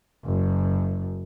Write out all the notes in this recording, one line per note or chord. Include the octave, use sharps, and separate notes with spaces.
F#1 F#2